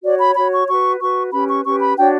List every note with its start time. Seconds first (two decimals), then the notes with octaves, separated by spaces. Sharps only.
0.04 F#4 C#5 D5
0.20 B5
0.36 F#4 C#5 B5
0.52 C#6
0.68 F#4 B4 C#6
1.00 F#4 B4 C#6
1.32 C#4 G4 B4 B5
1.49 C#6
1.65 C#4 G4 B4 C#6
1.81 B5
1.97 D4 F#4 C#5 G5